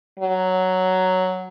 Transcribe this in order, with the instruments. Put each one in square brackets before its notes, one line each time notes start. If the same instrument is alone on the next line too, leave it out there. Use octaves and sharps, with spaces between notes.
[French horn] F#3